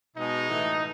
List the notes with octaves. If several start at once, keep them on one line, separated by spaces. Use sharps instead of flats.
B2 G#3 D#4
A2 E3 A3